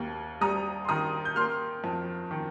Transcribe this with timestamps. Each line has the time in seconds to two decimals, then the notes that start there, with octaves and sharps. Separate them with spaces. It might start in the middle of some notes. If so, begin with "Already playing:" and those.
Already playing: D#2 A#3
0.41 G3 A#5 D#6
0.85 C6
0.89 D#3 A#5 D#6
1.25 G6
1.36 A#3 C6 F6
1.84 F2
2.31 D#3